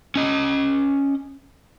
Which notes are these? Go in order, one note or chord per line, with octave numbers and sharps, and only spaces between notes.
C#4 D#5